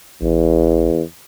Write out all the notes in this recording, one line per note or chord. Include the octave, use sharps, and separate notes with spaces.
A1 E2